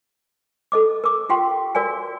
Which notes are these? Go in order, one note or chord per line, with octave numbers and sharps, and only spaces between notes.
A4 D#5 D6
A#4 D6
F4 G4 F5 G5 C6
F#4 A#4 D5 F5 G#5